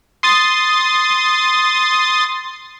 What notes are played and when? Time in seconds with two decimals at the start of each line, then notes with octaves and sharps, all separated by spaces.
0.23 C6 D#6 A6